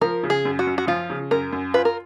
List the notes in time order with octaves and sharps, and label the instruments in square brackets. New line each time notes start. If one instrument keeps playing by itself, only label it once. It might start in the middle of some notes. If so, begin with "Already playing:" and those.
[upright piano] F3 [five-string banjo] A#4
[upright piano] C#3
[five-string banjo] G#4
[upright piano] F#2
[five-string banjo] F#4
[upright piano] F#2
[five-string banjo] F#4
[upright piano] F3 [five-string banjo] F4
[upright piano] C#3
[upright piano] F#2 [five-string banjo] A#4
[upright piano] F#2
[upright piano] F4 [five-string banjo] B4
[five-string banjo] A#4